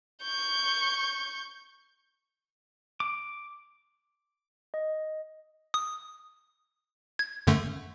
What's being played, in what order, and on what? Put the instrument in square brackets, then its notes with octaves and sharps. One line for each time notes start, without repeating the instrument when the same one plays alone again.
[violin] C#6 G6
[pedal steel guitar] D6
[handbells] D#5
[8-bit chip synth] D#6
G#6
F#2 D3 A3